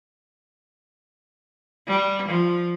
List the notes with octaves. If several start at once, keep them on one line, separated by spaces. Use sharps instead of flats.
G3
F3